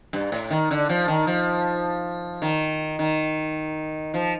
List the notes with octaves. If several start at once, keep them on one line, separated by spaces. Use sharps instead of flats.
G2
A2
D#3
D3
F3
D#3
F3
D#3
D#3
F3